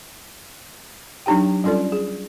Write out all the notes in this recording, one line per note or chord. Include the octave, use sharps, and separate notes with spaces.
F#3 D4 D#4 G4 G5
G3 C#4 F4 A4 D5
G#4